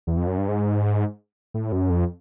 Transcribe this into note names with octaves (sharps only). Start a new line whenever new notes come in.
E2
F2
F#2
G2
G#2
A2
F#2
F2